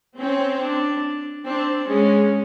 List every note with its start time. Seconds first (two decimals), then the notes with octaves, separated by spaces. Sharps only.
0.20 C4 C#4
0.62 D4
1.46 C4 D4
1.88 G#3 C#4